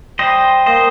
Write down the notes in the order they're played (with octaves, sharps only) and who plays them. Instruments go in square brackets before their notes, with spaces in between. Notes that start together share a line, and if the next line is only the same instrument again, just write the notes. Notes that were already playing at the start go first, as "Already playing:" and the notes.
[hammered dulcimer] G3 [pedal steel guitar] C5 D#5
[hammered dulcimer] A#3 [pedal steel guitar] C5 D#5